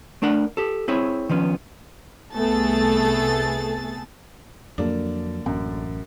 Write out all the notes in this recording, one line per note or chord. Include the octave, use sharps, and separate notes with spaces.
A3 D4 A#4 F#5
G4 A4
C4 E4 G#4 C#5
D#3 F3 B3 C#4
C2 A3 B3 G#4 A4 A6
F2 D3 F#3 A#3 D4 A4
A1 F#2